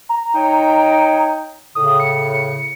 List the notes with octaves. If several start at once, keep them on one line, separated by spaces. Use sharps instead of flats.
A#5
D#4 C#5 G5
A2 C#3 D#6
C#7